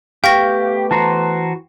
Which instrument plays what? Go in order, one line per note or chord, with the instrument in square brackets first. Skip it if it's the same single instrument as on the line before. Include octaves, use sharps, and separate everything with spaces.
[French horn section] A3 B3 B4 [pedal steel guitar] G4 [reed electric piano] F5 [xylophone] G5 C#6 A#6
[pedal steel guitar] E3 F#4 C5 [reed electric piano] A5 A#5